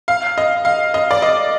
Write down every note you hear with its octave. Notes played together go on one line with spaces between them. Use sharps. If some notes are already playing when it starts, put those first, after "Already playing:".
F5
D#5
F5
D#5
D5
D#5